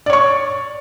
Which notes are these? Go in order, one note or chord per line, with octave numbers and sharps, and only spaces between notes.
C#5 D5 C#6